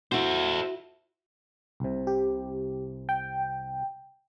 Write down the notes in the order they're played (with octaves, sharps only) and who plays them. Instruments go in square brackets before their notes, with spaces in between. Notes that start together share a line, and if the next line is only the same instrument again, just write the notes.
[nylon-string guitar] E4 F#4 [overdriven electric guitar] A4 C5
[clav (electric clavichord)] C2 C3
[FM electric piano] G4
G5